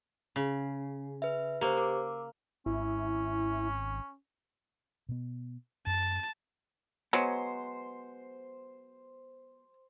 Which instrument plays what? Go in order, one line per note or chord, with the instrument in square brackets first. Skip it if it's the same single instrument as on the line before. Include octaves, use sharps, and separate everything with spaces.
[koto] C#3
[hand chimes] B4 E5
[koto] A#3 [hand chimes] G4 A#4 C5
[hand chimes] A#4 D6
[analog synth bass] G#1 [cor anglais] C#4 [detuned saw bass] E4
[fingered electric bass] B2 B3
[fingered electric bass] F#2 [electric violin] A5
[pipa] F#3 G#3 [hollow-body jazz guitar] B3 [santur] C5